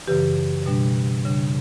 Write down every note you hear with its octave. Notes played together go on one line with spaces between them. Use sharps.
F#2 C#3 E3 G4 B4
B2 G3 D4
C#3 G3 D4